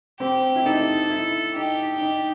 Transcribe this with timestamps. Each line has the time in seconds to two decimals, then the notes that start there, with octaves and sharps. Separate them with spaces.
0.20 C4 G4
0.56 E4
0.66 D#4 A4
1.10 E4
1.56 D#4 G4
2.01 D#4